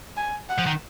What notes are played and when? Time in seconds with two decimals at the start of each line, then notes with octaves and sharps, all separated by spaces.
0.17 G#5
0.49 F#5
0.58 F3
0.66 D#3